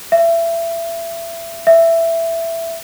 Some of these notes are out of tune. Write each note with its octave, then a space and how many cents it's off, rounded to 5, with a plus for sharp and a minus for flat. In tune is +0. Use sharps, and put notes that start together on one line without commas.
E5 +25
E5 +10